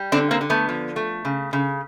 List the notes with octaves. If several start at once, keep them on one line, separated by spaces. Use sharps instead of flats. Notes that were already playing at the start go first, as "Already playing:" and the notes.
Already playing: G3
D3 C4 D4
A#3 C4
D3
A3 B3
F3
A3
C#3
C#3